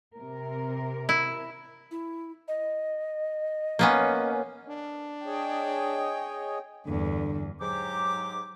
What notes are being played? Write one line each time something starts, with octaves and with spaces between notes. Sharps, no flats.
C3 A#4
E4
E4
D#5
A#3 B3 C#4
D4
G#4 C#5 D#5 G5
E2 G2 D3
G#2 F#3 G4 D6